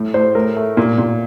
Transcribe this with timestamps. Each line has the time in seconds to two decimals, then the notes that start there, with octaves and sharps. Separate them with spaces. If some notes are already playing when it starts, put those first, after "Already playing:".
Already playing: A2
0.14 A2 C5
0.35 A2 A#4
0.56 A3
0.77 A#2
0.98 A#2